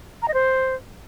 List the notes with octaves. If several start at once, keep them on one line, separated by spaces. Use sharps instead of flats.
A#5
D#5
C5